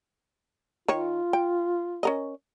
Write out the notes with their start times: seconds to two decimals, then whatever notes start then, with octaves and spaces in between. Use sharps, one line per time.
0.88 D#3 F4 C#5
1.33 G5
2.03 C#4 A#4 D#5